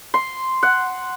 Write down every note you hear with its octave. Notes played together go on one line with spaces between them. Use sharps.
C6
F#5